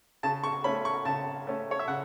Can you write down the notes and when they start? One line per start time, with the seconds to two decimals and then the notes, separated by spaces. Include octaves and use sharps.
0.23 C#3 A5
0.44 C#6
0.64 A3 C#4 B5
0.85 C#6
1.05 C#3 A5
1.47 A3 C#4
1.71 C#5
1.79 E5
1.88 C#3 F#5